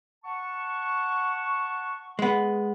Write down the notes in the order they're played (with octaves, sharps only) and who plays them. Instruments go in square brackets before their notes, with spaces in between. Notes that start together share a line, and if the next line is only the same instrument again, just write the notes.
[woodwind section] F#5 A5 C#6
[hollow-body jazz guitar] G#3 B3